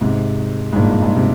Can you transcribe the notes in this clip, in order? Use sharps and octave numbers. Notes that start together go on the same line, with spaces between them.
G#2 C3
G#2
G2 A#2
G#2
C3